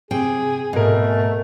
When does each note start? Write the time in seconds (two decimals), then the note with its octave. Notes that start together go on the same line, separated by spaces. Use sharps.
0.11 C3 G#4 G5
0.73 G#2 B2 A3 A#4